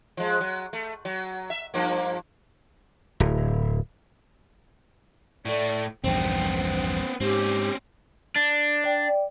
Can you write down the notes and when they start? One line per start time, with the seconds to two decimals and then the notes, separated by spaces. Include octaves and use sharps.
0.17 F3 G#3
0.40 F#3
0.73 A3
1.05 F#3
1.50 E5
1.74 G2 F3 A#3
3.20 D1
5.46 A2 A3 D5
6.04 A#1 E2 G2 B3 C4 G5
7.20 G#2 C4 C#4 G4
8.36 D4
8.84 D5 G5